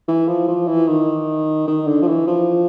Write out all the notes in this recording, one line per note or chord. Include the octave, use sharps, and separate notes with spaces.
E3
F3
F3
E3
D#3
D#3
D3
F3
E3
F3